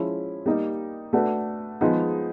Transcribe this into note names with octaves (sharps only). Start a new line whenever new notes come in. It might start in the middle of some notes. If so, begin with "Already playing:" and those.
Already playing: F3 G#3 C#4 E4
G3 A#3 D#4 G4
A3 D4 F#4 B4
F3 G#3 B3 D#4 G#4